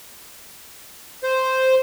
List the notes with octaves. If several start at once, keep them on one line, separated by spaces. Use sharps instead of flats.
C5